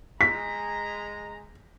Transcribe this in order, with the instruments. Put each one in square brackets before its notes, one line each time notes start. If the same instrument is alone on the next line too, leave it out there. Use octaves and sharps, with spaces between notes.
[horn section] G#3 A#5 [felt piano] B6